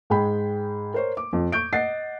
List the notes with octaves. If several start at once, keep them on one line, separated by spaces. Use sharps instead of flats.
G#2 G#3 G#4 G5 B5
A#4 C5 C#5
D6
F2
C#6 G6 D7
D#5 F#5 A6 C7